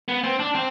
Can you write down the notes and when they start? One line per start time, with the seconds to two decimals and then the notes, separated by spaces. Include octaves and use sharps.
0.08 B3
0.24 C4
0.39 D4
0.55 C4